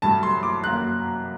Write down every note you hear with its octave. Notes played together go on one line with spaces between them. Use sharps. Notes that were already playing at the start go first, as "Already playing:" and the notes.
G2 F#3 A3 A5
C6
D6
F#2 F#3 A#3 F#6